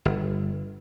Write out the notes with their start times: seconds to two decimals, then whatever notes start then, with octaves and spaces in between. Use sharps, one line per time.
0.05 G1